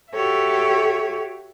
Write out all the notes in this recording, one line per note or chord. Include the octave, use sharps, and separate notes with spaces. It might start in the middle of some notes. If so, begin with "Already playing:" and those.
F#4 G4 A4 C#5 E5